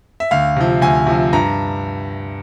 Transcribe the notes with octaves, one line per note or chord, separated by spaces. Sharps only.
E5
D2 F5
C3 F3
D2 G#5
C3 F3
G2 A#5